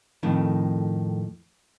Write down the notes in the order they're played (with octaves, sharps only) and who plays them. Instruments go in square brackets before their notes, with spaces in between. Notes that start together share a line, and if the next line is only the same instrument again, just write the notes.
[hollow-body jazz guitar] F2 A2 D#3